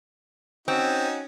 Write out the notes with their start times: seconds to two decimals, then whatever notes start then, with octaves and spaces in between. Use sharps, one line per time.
0.68 C4 C#4 D#4 F#4